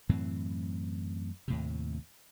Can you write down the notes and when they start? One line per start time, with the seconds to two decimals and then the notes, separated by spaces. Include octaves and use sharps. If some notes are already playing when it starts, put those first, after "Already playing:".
0.09 F#2 A2 E3 C4
1.48 D#2 A2 C3